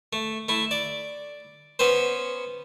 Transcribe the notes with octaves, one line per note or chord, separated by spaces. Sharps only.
A3
A3 E4
D5
B3 C#4 B4 C5